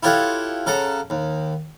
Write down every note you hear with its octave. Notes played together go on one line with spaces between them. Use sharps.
E4 F4 G4 A4 C#5 F#5
C#3 A4 F#5 A#5
D#2